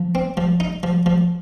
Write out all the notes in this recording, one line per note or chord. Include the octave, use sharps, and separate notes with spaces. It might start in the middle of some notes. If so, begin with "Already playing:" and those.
Already playing: F3
C4
F3
D#4
F3
F3